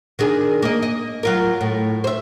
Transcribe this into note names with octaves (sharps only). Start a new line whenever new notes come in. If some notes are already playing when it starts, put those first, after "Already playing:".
D#3 D4 G#4
A#3 D#5
D#5
F#3 F4 A#4
A2
C5 E5